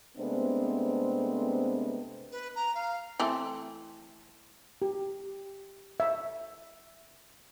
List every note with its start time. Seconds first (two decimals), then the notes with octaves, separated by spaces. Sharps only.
0.17 C3 G#3 A3 B3 C4 D4
2.32 B4
2.55 A#5
2.74 F5
3.20 E3 A3 C4
4.82 G4
6.00 E5